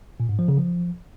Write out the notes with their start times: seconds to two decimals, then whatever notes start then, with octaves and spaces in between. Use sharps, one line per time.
0.20 A#2
0.29 G#2
0.39 F3
0.48 C#3
0.58 F3